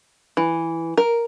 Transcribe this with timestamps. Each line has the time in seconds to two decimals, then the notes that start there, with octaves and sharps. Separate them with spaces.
0.37 E3
0.97 A#4